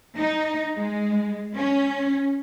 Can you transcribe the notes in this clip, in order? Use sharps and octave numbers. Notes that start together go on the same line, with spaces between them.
D#4
G#3
C#4